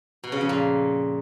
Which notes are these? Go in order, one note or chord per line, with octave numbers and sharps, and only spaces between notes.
B2
C#3
F2
A#2